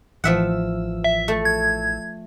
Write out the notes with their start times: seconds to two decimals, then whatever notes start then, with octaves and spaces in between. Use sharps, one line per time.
0.24 A1 E3 F3 E5 F#5 E6
1.04 E5
1.28 A3
1.45 G#6